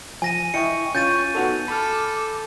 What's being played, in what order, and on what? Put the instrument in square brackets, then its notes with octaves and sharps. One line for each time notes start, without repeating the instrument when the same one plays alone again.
[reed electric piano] F3 [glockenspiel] G#5 A#6 D#7
[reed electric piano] E4 D#5 G5 [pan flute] C#6 [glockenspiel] C#7
[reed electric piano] C#4 F4 [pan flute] C#6 [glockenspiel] G6 A6 D#7
[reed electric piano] B3 F#4 A4 [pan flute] D#4
[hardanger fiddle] A4 [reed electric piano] B5 F6 [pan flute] D6